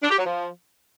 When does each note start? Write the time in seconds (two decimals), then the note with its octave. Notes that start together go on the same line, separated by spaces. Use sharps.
0.02 D4
0.10 G4
0.18 F#3
0.26 F3